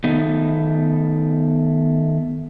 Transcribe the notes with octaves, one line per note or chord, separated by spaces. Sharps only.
D#3 A3 B3 D#4